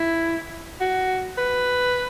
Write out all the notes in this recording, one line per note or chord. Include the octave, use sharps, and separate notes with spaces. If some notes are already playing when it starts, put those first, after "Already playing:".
Already playing: E4
F#4
B4